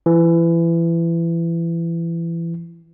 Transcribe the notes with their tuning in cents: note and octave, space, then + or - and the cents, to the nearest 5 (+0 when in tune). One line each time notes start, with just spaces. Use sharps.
E3 +25